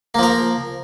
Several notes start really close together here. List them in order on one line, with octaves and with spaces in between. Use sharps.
A#3 F3 A#4